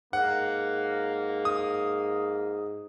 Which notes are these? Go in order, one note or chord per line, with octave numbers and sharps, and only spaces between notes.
G#2 A#3 F#5
D#6